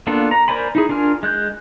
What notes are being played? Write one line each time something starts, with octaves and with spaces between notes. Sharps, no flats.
A#3 B3 D4 F4 A4
A#5
A#4 C5 D5 G#5 B5
D#4 E4 G#4
D4 F4 A#4 G#5 F6
G#3 F#6 G6